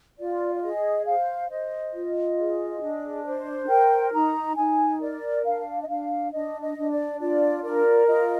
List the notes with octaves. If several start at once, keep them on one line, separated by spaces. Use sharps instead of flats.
F4 D5
D5
G#4 D#5
C5 F5
C5 D#5
F4
G#4
D4
C5
A#4 G5
D#4 A#5
D#4 G#5
A#4 D5
D4 F5
D#5
D4 F5
D4 D#5
D#5
D4
D5
F4 D5
A#4 D5
F4 D#5